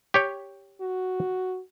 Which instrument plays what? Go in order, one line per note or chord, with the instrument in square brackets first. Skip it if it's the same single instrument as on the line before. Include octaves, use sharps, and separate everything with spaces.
[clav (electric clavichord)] G4 C#5 G5
[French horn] F#4